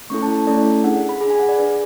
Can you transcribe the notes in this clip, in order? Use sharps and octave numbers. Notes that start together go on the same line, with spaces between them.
A3 C#4 E4 A4 C#6
A5
A5
A3 C#4 E4 A4 D5
D4 G#4 F#5
B5
D4 G#4 B5
G#5
F#5
D5
D4 G#4 B4